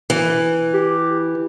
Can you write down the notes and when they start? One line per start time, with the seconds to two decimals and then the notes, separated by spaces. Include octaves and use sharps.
0.10 E3
0.73 G4